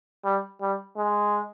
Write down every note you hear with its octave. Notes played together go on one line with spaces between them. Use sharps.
G3
G3
G#3